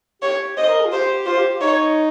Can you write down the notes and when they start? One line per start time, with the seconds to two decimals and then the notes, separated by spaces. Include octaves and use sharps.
0.22 G4 C#5
0.57 C5 D#5
0.69 A#4
0.80 G#4
0.86 F4
0.92 G4 C5
1.26 F4 C5
1.38 G4
1.49 G4
1.61 D#4 C#5